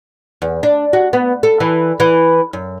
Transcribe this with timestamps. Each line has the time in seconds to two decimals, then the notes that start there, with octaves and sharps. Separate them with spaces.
0.42 E2
0.63 D4
0.93 F#4
1.13 B3
1.43 A4
1.60 E3
2.00 E3
2.53 F#2